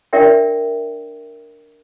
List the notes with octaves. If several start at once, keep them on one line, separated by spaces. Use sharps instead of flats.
D4 G4 A#4 D5 E5 G5